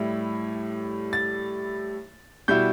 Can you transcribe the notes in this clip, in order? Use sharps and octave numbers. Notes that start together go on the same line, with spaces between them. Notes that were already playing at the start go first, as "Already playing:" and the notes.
Already playing: A2 G3 E4
A6
B2 G3 E4 G6